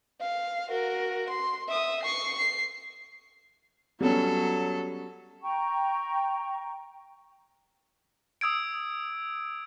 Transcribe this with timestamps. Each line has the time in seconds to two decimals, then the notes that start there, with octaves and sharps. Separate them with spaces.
0.21 F5
0.69 F#4 A#4
1.29 C6
1.68 E5 D#6
2.03 C#6 C7
2.38 C7
4.01 F#3 G3 B3 C#4 A4
5.43 G5 A#5 C#6
8.41 D#6 E6 G#6 D7